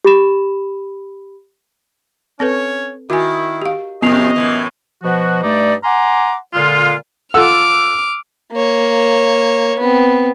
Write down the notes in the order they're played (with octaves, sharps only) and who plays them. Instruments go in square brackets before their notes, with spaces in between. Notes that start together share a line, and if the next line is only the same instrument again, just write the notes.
[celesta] G4 B5 E7
[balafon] C4 A4 B4 [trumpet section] C#4 C#5
[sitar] D#3 [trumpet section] E4 [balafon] F#4 G#5
[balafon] G4 F5
[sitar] F2 A2 C3 [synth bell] B3 C7 F7 [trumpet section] D#5
[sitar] F#2 A2 E3
[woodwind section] B2 F3 F#4
G2 A3 D#4 D5
F#5 G#5 A#5 C6 D6
A#2 D3 G#3 F4
[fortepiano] F4 A4 F#5 [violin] D6 F6 [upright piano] E6
[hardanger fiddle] A#3 C#5
B3 C4